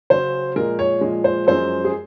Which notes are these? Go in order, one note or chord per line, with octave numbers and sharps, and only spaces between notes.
C#3 F#3 C#4 C5
A#2 F3 G#3 A#4
C#5
A#2 F3 G#3
C5
F#2 F3 G#3 C5
G#4